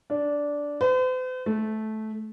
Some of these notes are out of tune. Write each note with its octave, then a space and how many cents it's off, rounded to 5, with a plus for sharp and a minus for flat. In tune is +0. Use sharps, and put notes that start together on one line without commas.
D4 -10
C5 -45
A3 -15